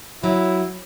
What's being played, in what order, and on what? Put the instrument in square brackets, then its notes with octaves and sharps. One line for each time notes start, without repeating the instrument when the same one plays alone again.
[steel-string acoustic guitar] F#3 [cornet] E4